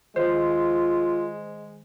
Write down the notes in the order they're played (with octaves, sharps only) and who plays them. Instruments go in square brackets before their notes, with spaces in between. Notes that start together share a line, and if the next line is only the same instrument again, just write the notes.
[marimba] D#3 [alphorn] G#3 [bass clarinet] F4 [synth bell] C5